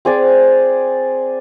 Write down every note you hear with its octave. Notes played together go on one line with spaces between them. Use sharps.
C4 G#4 D5